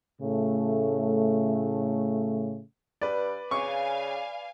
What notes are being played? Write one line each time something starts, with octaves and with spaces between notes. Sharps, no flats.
A2 C#3 A3
G2 B4 D5
C#3 F5 G#5 C#6